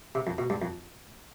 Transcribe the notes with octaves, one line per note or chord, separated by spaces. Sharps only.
C3
F2
B2
G2
F2